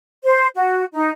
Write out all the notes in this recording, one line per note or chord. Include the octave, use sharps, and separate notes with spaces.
C5
F#4
D#4